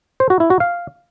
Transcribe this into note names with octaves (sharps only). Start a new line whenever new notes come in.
C5
F#4
E4
F#4
F5